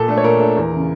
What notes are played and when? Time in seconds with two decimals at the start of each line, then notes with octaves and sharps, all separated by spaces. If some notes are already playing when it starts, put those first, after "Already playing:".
Already playing: A#2 A4
0.08 A3 D4
0.18 C#5
0.24 A#2 A#4
0.40 A3 D4
0.57 E2
0.72 C#3 E3